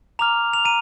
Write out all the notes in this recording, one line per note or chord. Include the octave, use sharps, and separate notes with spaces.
A#5 D6 F6 F7
F7
A#5 D#7